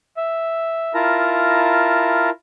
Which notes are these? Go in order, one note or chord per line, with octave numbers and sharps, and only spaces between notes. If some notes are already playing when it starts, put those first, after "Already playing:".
E5
E4 F4 A#4 A5 A#5